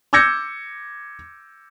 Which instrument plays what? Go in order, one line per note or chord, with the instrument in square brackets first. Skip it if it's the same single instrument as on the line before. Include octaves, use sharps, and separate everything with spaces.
[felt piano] D6 E6 G6 G#6 A#6 C#7